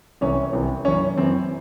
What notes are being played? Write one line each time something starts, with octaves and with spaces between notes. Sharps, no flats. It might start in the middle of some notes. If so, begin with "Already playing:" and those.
C2 C3 E3 C#4
C2 C3 E3
F#2 E3 C#4
F#2 E3 C4